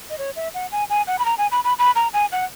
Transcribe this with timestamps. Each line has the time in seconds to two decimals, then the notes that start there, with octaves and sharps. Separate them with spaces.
0.10 D#5
0.18 C#5
0.36 E5
0.54 F#5
0.72 G#5
0.90 G#5
1.07 F#5
1.19 B5
1.25 A#5
1.38 G#5
1.52 B5
1.64 B5
1.79 B5
1.96 A#5
2.13 G#5
2.32 F#5